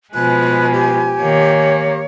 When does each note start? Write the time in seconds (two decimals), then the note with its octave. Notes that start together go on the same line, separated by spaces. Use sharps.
0.14 B2 F3 G#3 B4 G#5 F#6
0.73 G4
1.22 D#3 A#3 C#5